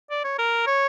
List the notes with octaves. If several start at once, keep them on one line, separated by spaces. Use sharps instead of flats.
D5
C#5
A#4
C#5